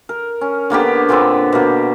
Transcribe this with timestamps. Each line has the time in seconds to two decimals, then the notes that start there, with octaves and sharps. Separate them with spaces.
0.09 A#4
0.41 C#4
0.70 D3 A#3 B3 G4
1.09 A#2 D3 B3 C4
1.53 B2 A#3